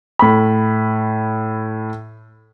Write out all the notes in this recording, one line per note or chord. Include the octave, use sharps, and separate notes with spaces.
A2 B5